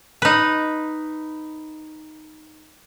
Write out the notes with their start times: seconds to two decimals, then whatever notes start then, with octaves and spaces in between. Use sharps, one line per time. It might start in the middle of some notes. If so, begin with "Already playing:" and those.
0.22 D#4 B4